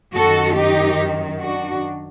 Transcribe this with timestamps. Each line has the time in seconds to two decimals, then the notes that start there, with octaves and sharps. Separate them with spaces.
0.14 F#2 D#3 F#4 A4
0.56 D#4 G4
1.40 D4 F#4